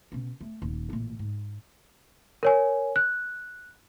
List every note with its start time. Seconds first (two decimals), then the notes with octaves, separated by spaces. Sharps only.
0.12 B2 C#4
0.41 A3
0.62 D#1
0.90 A1 A#2
1.19 G#2
2.43 A#4 C#5 G#5
2.96 F#6